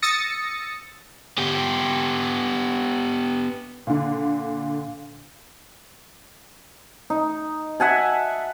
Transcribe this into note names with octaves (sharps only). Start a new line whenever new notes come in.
D#6 E6 A6 A#6 C#7
B3 G4
A#2 D3
D#4
E5 F#5 G#5 A5